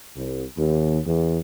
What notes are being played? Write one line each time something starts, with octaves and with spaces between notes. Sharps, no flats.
C2
D#2
E2